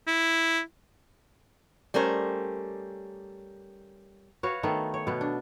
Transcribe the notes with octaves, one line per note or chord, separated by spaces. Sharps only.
E4
G3 A3 C#4 A#4 C5
F#4 B4 C#5 F5
D#3 A3 B3
C#5
B2 B3
D4